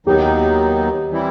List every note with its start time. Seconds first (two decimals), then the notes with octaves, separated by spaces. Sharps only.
0.06 D#2 D#3 F#3 B3 D#4 G4
1.10 E3 G3 C4 E4